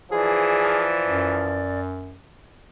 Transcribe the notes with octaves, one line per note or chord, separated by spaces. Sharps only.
E3 F3 G#4 D5
F#2